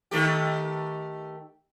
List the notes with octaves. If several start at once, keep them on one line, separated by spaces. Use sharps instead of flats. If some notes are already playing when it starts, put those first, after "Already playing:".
D#3 A3 G4